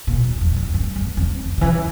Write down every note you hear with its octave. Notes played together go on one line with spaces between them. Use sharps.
A#2
A#2
F2
F2
G2
E2
F2
F2
C#3
E3